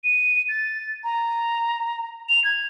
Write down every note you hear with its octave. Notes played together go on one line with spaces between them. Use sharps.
D#7
A6
A#5
F7
G#6